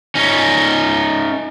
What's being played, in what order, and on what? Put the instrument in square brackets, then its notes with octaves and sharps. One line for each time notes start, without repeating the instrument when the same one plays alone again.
[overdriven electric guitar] C#4 D#4